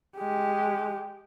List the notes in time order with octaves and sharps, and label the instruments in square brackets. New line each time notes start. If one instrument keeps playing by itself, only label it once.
[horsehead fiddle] G#3 G4